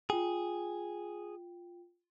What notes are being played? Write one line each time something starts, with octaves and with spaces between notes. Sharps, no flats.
F4 G#4 G5